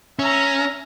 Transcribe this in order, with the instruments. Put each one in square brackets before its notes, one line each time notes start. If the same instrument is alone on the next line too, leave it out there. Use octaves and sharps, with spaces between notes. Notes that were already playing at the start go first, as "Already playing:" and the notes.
[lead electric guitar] C#4 [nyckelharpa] E5 A#5